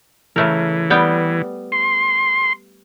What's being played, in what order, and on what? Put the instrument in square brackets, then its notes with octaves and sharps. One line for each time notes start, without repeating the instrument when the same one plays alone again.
[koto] C#3 A3 A#4 [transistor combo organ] E3
[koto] G3 B3 G5
[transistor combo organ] C6